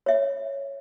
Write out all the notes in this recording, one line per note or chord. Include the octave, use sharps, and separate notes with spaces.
C#5 E5